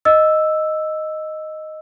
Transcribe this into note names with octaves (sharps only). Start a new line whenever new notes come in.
D#5 E6